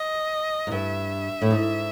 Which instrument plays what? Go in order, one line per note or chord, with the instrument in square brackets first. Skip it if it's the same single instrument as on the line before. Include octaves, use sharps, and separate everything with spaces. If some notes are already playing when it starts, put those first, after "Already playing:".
Already playing: [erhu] D#5
[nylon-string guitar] G#2
[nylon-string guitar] G2 [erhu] E5
[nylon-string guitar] A2
G#2